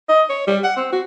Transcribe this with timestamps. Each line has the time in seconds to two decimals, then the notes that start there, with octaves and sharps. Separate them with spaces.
0.09 D#5
0.30 C#5
0.47 G3
0.64 F#5
0.77 C4
0.93 F#4